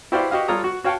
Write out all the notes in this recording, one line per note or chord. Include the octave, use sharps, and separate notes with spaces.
E4 F#4 G4 C5 D5 F5
F#4 G4 D#5 F5
G3 F4 A4 C#5 A#5 D#6
F#4
F#4 C#5 F5 G5 A5